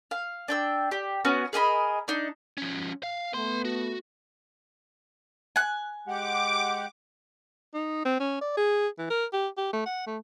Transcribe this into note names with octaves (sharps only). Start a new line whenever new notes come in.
F5
D4 G5 E6
G4
B3 C#4 F#4
G#4 A#4 D#5 B5
D4 D#4
F3 C#4
F5
A3 B3 B4 C6
F#4
G#5 F#6
G#3 G4 F#5 D6
D#4
C4
C#4
D5
G#4
E3
A#4
G4
G4
A3
F#5
A3